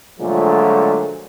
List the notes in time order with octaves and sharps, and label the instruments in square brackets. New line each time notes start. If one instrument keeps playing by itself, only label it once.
[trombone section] A#2 D3 F3 F#3 G#3 A3